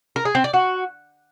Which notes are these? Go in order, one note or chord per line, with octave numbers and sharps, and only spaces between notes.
A#4
G#4
C4
D5
F#4